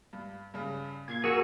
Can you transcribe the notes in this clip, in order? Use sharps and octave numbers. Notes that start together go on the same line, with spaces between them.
G2
G2 C#3
A#2 G#6 C7
F#4 G#4 A#4 C#6 E6